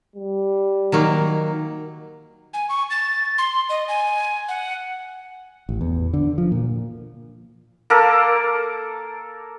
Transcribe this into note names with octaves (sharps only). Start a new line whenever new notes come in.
G3
D#3 F#3 A#3
G#5
C#6
A6
C6
D#5
G#5
F#5
A1
E2
D3
F3
A#2
A#3 A4 A#4